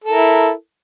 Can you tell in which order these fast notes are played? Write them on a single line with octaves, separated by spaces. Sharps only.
A4 A#4 E4